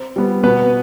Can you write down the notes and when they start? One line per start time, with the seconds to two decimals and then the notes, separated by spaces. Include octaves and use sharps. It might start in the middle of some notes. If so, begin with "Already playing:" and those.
Already playing: C4
0.16 G3 B3
0.44 B2 B3 B4